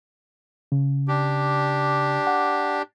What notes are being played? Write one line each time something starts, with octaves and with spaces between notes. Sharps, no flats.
C#3
D4 G4
F#5